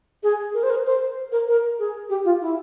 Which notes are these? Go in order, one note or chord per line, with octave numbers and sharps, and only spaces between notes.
G#4
A#4
C5
A#4
C5
A#4
A#4
G#4
G4
F4
E4